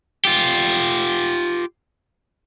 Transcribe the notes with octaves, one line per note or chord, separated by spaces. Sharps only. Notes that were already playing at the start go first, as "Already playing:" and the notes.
F4 G4